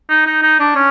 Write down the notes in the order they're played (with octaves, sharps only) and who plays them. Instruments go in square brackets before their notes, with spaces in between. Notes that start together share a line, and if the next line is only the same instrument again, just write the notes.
[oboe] D#4
D#4
D#4
D4
C#4